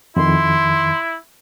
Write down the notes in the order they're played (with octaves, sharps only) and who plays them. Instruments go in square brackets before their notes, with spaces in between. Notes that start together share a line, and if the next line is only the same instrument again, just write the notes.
[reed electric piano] F2 D#3 [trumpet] E4 [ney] C6